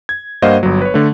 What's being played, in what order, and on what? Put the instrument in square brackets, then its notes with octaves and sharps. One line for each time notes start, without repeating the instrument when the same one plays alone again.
[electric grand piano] G#6
G2 A#3 C5 D#5 F5 F#5
G1 F#3
B4 C#5
D3 A3